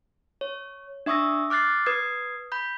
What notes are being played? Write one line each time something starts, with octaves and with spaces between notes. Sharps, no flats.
C#5
D4 E5 C#6 D#6 E6 A#6
D6 F6 F#6 A6 C7
B4 D#6 G#6 C7
B5 G6